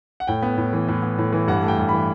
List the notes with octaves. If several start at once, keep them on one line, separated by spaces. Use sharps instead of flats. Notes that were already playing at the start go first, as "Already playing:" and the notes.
F#5
A2 G5
B3
A2
E3
A2
B3
A2
E3
G2 F#5
A3
G5
G2
E3 B5